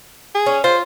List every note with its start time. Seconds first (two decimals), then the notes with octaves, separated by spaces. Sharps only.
0.35 G#4
0.46 C#4
0.64 F4 C5